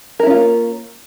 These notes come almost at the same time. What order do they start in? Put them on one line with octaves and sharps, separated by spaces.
A#4 E4 C#4 F4 A#3